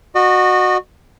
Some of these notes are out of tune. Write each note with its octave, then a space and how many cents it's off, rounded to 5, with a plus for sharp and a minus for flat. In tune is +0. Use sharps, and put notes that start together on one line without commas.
F#4 -10 D#5 -40